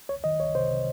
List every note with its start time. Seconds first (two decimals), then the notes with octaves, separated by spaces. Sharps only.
0.09 C2 C#5
0.24 D#3 D#5
0.39 C2 C#5
0.55 C3 C5
0.71 C3